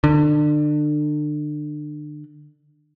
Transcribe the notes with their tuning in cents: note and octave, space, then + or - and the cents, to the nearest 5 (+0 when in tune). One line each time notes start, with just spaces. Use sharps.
D3 +30